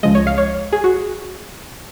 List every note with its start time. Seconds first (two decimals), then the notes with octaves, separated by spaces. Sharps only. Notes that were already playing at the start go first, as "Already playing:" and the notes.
0.03 C#2 C#3 F3 G#3 D#5
0.15 C#5
0.27 F5
0.38 C#5
0.72 G#4
0.84 F#4